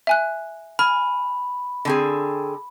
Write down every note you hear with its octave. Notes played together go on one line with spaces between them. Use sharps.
E5 G#5 F#6
G#5 B5 F6
D3 C4 G#4